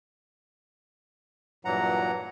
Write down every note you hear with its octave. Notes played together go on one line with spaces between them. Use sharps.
G2 A#2 E3 F#3 F#5 A#5